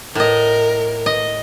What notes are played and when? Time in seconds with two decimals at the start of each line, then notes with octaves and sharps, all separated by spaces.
0.15 A2 A#4 D#5
1.06 D#5